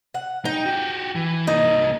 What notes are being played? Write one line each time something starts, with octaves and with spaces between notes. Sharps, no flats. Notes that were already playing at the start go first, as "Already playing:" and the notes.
F#5
D#4 G5
F#4 G4
E3
C2 A#3 D#4